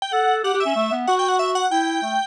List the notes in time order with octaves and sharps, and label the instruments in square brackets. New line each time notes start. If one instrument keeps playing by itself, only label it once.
[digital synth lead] G5
[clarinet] A4 [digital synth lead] F#5
[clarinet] G4 [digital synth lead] F#5
[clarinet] G4
[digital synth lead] E5
[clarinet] C#4
A3
B3
[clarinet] F#4 [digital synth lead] F#5
[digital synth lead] G5
F#5
E5
F#5
[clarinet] E4 [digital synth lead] G5
[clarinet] A3